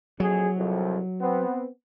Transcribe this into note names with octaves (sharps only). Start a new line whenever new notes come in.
A#1 F2 F#3 G#4
C2 F2
B3 C4